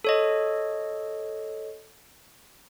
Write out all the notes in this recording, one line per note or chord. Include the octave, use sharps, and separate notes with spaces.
A4 C#5 D#5